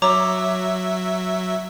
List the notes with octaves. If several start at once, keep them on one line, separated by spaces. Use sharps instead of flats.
F#3 C#5 E5 A#5 D6